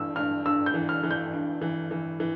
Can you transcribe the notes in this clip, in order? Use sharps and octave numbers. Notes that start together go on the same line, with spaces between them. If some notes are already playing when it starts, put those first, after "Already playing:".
Already playing: G2 E3 E6
G2 F6
G2 E6
G6
E3
F6
E3
G6
G2
E3
E3
E3